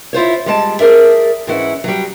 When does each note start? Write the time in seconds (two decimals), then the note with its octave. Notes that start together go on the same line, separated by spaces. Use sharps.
0.13 E4 F4 C5 C#5
0.46 G3 G#3 A5
0.80 G#4 A#4 D5 E5
1.47 G#2 E3 C#4 E4 F#5
1.84 F#3 G3